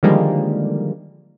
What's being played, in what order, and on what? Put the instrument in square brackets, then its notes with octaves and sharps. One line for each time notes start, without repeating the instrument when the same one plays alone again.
[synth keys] D3 D#3 F3 G3 G#3 A#3